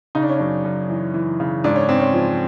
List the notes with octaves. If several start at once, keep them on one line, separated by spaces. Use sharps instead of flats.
C#3 D#4
D4
C#4
F#2 D4
F#2
E3
E3
C#3
G#2 D4
C#4
G#2 C4
C#4
F3